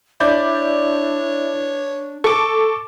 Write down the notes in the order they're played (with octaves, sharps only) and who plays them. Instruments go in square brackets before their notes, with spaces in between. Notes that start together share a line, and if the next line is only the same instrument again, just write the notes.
[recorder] D4 [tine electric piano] E4 [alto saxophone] C#5 [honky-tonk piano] D5 G6
[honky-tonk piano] A4 [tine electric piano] C#6 D6